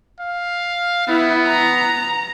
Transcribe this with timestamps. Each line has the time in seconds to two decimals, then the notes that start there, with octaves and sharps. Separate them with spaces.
0.20 F5
1.08 B3 E4
1.47 A#5